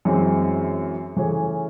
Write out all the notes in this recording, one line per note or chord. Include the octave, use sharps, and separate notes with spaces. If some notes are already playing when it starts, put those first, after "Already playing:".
F#2 E3 G#3 C4
C#3 E3 A3 C#4 G#4